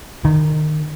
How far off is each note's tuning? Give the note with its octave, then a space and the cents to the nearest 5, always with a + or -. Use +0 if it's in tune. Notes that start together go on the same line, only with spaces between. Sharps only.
D#3 -25